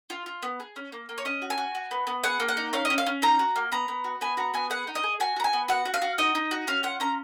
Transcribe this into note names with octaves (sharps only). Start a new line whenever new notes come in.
F4
F4
B3
G#4
C#4
A#3
A#3
C#5
C#4 D#5
F#4
G#5
F#4
F#4
B3
B3
G#4 F#5
A#3
F#5
D#4
C#4 F5
D#5
C#4
F5
C#4
D#4 A#5
F#4
A#3
B3 A#5
B3
F#4
B3 G#5
F#4 A#5
B3 G#5
G#4 F#5
D#4
D#5
G#4
F#4 G#5
F#4 A#5
G#5
B3
F#4 F#5
F#4
F5
F#4
D#4 D#5
D#4
F#4
C#4 F5
F4 F#5
C#4 A#5